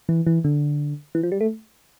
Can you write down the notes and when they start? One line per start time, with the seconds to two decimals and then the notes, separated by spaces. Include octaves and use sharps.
0.09 E3
0.27 E3
0.44 D3
1.15 E3
1.23 F3
1.32 G3
1.41 A3